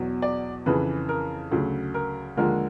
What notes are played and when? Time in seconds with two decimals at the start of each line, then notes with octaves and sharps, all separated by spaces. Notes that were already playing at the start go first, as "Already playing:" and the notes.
Already playing: E2 B2 F#3
0.22 D5
0.66 F2 C#3 E3 B4
1.09 A#4
1.51 D2 C#3 F#3
1.94 A#4
2.37 D#2 D3 F3 G#3 A#4